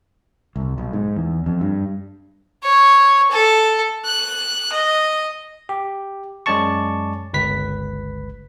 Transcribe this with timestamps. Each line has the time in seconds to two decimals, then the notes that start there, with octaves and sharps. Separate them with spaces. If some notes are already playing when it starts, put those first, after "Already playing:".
0.56 C2
0.78 B1
0.93 G#2
1.16 E2
1.46 F2
1.61 G2
2.63 C#5
3.31 A4
4.05 F#6
4.72 D#5
5.69 G4
6.46 F#2 G#3 C#4 D5 A5 C#6
7.33 G1 C#2 B4 B6